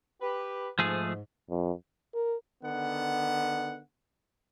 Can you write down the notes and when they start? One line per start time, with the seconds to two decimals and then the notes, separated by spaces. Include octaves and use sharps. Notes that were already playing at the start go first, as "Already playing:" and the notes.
0.21 G4 B4
0.79 G#2 F3 A3 G#4
1.50 F2
2.15 A#4
2.64 D3 D#3 B3 F#5